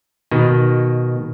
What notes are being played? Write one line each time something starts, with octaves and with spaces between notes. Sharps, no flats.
B2 D#3